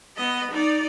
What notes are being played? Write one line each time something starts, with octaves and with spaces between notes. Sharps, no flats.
B3 D#5
D#4 D5